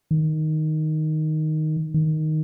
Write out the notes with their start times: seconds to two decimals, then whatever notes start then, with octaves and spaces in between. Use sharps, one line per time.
0.11 D#3
1.94 D#3